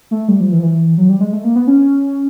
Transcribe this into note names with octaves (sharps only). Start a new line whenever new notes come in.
A3
G3
F3
E3
F3
E3
F#3
G3
G#3
A3
A#3
B3
C#4